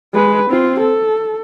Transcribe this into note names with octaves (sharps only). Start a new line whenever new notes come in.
G#3 B4
C4 F4
A4